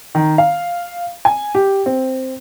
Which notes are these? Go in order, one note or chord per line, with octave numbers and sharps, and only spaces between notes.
D#3
F5
G#5
G4
C4